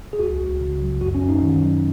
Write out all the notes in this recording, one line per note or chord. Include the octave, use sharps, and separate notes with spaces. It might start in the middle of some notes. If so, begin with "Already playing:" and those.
G#4
C#2 F#4
C#2
C#3
F#3
F#2 F#4
C#4
F#2
D#4
D#3
F#3